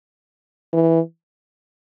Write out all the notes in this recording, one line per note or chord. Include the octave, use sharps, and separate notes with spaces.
E3